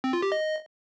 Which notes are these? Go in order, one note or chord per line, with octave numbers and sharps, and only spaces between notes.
C4
F4
G4
D#5